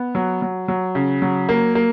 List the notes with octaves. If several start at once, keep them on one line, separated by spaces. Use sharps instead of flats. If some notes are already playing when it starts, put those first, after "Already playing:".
Already playing: B3
F#3
F#3
F#3
C#3
F#3
A#3
A#3